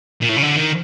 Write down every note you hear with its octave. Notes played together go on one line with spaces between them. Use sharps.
A#2
A2
C#3
D3
D#3